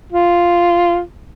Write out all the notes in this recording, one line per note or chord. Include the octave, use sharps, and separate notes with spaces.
F4